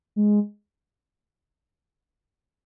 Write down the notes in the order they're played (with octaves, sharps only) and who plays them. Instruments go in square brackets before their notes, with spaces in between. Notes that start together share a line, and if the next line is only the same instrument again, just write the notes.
[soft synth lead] G#3